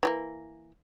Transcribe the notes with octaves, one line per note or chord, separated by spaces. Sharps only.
E3 G3 A#3